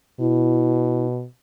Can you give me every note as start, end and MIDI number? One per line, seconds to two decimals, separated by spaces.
0.20 1.25 47
0.20 1.06 64